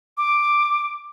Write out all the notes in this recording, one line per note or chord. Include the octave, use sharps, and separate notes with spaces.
D6